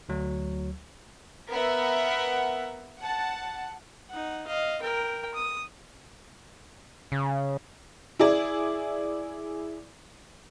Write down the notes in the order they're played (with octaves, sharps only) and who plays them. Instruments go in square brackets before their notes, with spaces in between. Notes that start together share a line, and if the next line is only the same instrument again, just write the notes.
[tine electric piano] D2 F#3
[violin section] B3 A#4 E5 F#5
F#5 A5
[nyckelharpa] D#4 F#5
D#5 F5
A#4 G5
D#6
[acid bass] C#3
[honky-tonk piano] E4 G#4 D5